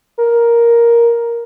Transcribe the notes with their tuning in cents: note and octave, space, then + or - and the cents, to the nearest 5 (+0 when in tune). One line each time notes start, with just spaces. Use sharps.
A#4 +5